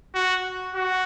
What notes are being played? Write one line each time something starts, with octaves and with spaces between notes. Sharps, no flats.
F#4
F#4